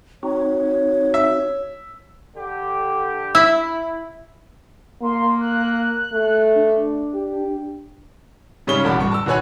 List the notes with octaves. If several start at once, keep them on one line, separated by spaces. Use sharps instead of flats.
C4 D#4 F#4 C#5
E5
D3 G4
E4 E5
A#3 C6
F#6
A3
D4
G4
G#2 C#3 G3 C#4 C#5 G7
E1 F#4 D5 A5 B5
D1 G2 C#6
A5 E6
D#1 F#4 B4 C#5 G#5 F#6